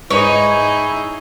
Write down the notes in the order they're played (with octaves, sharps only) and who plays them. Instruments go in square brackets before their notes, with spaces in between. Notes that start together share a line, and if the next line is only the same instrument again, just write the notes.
[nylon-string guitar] G#2 B4 D#5 [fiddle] D#4 G#4 [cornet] E4 [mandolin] C#5